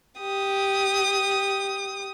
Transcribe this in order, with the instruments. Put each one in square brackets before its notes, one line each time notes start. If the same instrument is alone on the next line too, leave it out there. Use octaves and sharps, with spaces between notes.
[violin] G4 D#6